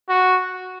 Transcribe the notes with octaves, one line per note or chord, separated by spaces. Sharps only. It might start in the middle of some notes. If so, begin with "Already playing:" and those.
F#4